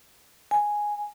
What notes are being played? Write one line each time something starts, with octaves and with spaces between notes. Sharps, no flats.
G#5